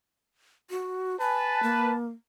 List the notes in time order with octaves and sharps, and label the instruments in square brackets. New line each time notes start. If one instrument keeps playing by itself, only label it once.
[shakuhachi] F#4
[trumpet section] B4 A5 [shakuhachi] G#5
[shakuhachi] A#3